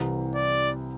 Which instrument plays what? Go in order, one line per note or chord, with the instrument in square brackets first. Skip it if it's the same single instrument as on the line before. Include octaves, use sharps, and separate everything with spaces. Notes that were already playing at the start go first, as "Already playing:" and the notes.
Already playing: [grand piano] C2 C3 E3
[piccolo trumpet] D5